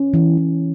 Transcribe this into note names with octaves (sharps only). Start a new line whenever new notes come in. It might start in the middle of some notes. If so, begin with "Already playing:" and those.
Already playing: C#4
E3
E3